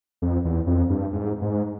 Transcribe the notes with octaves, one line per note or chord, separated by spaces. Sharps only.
F2
E2
F2
G2
G#2
G#2